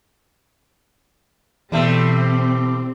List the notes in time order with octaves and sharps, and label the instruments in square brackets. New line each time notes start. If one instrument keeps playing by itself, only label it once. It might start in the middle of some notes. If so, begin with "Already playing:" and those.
[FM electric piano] B2 E3 [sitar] G3 A3 [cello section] C4